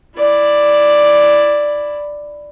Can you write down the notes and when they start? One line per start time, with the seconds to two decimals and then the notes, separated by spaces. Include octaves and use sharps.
0.16 E4 D5